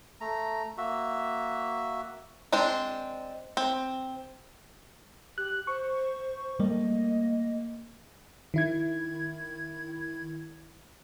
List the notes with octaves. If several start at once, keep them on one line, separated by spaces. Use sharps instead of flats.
A3 A#5
A#3 F#4 E5
G#3 C4 D4 C5
C4
G4 F#6
C5 C#6
G3 A3 A#3 D#5
D#3 E4 G#6